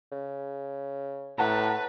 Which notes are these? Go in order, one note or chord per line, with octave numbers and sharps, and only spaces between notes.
C#3
A2 B4 F#5 A5 A#5